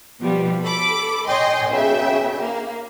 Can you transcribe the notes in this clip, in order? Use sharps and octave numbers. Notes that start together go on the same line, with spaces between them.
B2 F3 G3 B3
A4 B5 D6
C#5 D#5 G5 G#5 C6
B1 C#3 G#4 E5 G5
A#3